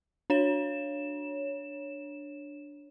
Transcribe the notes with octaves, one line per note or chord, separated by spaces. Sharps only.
D4 C#5 E7